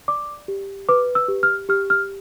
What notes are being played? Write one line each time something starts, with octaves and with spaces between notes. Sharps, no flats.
D5 D6
G4
B4 D6
E6
G4
F6
G4 F6
F6